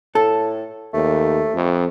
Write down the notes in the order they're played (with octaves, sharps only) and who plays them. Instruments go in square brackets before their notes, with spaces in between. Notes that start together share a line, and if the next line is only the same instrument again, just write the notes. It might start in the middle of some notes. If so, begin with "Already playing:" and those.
[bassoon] A2 [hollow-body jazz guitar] A4
[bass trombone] D#2 [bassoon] A3
[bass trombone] F2